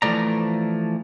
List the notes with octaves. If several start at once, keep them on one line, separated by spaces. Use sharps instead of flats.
E3 F3 A3 D5 A#5